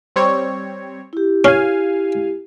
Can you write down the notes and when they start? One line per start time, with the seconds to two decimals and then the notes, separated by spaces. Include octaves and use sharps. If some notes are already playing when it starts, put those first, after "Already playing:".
0.16 G3 C4 C#5
1.13 E4 G4
1.45 C#4 F5 G#5